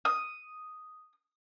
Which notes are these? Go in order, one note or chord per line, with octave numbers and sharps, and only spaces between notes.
D#6